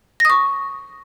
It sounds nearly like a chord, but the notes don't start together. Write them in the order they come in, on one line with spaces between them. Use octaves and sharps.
A#6 D#6 C#6